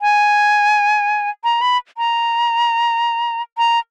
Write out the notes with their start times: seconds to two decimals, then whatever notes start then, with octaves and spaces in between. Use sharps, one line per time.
0.01 G#5
1.44 A#5
1.61 B5
1.98 A#5
3.58 A#5